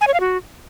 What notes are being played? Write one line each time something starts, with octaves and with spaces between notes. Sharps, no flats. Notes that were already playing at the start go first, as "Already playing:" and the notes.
G#5
C#5
F5
F#4